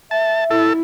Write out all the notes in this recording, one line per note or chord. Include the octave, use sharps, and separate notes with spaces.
E5 A5
E4 A4